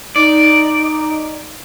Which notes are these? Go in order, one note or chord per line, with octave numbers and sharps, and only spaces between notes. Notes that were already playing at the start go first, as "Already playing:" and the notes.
D#4 D5